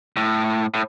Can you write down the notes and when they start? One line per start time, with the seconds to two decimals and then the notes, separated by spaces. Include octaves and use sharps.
0.17 A2
0.73 A2